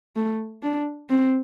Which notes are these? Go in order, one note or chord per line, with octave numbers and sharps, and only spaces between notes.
A3
D4
C4